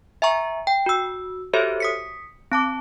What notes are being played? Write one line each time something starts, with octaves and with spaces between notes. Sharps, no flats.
E5 G#5 A#5 C#6
G5
F#4 E6
F#4 G4 A4 C5 C#5 E5
D#6 B6 C#7
C4 A5 D6